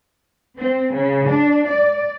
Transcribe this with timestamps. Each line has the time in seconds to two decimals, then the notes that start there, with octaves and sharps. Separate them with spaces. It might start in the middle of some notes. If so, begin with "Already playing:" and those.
0.58 C4
0.95 C#3
1.28 D4
1.69 D5